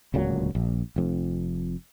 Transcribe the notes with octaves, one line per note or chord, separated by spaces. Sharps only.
D1 C#2 A#2 F#3
A#1
F1 F2